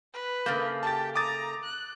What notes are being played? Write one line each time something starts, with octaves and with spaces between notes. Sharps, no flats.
B4
C#3 A3 A#3 G6
G4 A5 A6
A#5 D6 D#6 A6
F#6